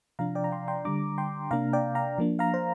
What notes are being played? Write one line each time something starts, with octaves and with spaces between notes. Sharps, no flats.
C3 F3 D4 F5 A#5
D5 G5
A#5
G5 C6
G5 C6
D3 G3 D4 A#5 D6
G5 C6
C3 A#3 D4 F5 A#5
D5 G5
F5 A#5
F3 A#3 D4
F5 A#5
C5